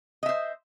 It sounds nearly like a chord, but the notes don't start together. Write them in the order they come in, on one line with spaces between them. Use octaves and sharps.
D#5 E5 C5